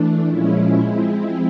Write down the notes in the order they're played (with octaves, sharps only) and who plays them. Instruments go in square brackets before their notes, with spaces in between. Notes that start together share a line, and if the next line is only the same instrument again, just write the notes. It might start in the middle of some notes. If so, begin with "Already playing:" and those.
Already playing: [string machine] E3 A3 D4
A#2 F3 G#3 C#4 E4
F3 G#3 C4 E4